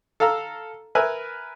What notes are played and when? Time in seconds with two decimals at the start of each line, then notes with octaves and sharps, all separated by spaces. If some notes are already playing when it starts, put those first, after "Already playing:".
0.20 A4 F5 A#5 E6
0.95 A#4 B4 E5 G#5